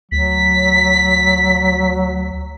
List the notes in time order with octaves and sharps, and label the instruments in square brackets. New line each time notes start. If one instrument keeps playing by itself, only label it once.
[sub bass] D2 [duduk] F#3 [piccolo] B6